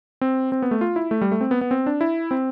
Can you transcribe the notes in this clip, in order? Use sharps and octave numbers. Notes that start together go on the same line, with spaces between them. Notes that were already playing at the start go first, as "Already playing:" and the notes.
C4
C4
B3
A3
F4
E4
A3
G3
A3
C4
B3
B3
C4
D4
E4
C4